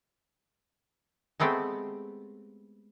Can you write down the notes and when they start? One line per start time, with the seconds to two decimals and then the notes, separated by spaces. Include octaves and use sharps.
1.40 G#3 A3 B3 C4 G4